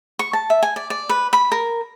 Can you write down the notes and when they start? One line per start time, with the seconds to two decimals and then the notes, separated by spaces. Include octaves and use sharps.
0.19 C#6
0.33 A5
0.50 E5
0.63 G#5
0.76 D5
0.90 D5
1.09 B4
1.33 B5
1.52 A#4